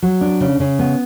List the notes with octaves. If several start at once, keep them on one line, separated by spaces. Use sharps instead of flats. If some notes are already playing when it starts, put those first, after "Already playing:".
F#3
D4
C#3
C#3
B3